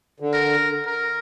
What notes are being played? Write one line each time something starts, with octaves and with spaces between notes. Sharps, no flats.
D3
A#4
A#4